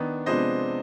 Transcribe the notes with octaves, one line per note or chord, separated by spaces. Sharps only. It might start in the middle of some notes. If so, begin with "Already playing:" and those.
Already playing: D#3 B3 D4
C3 F3 G#3 B3 D4 C5 D#5